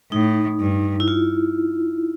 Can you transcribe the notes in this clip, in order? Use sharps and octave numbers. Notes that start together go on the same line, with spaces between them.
A2 D#4
G2
E4
F4